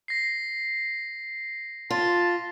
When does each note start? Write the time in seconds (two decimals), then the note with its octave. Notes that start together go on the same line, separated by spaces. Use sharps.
0.08 A#6 C7
1.90 F4 A5